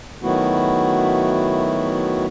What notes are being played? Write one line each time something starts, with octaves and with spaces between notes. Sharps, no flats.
D#3 F#3 A3 B3 E4 F#4